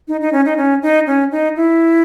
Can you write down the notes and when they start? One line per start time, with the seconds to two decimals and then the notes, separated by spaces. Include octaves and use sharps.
0.08 D#4
0.21 D#4
0.33 C#4
0.45 D#4
0.57 C#4
0.82 D#4
1.07 C#4
1.31 D#4
1.56 E4